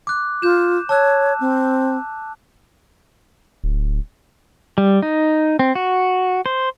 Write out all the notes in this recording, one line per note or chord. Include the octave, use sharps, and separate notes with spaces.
D6 F#6
F4 G6 E7
C#5 A5 E6 F#6
C4
D1
G3
D#4
C4
F#4
C5